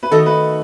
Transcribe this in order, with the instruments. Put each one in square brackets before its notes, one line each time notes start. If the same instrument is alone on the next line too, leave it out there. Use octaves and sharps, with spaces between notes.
[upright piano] B4
[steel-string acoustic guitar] D#3 A3 D#4 F#4 [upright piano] A4
[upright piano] B4